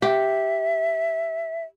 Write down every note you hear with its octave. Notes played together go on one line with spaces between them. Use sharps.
G4 E5